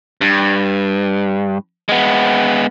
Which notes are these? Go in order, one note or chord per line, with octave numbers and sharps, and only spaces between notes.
G2
G#3 B3